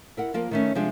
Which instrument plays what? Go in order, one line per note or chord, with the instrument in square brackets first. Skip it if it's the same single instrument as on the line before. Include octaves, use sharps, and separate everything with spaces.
[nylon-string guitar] E4 A#4 F#5
F3 A#3 F4 A#4
D#3 A3 C#4
C3 F3 G3 G#3 D4